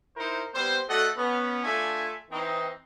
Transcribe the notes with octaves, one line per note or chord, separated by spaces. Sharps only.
D#4 E4 A#4 C5
G3 B3 C4 C5
A3 F#4 A4 D5 D#5 F#5
B3 C#4
A3 D4 F4 E5 G#5
E3 C4 D#4